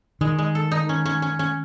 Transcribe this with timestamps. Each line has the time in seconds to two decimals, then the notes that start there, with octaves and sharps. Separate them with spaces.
0.21 D#3 G#3
0.39 G#3
0.55 A4
0.72 D#4
0.89 C#4
1.06 C#4
1.22 C#4
1.39 C#4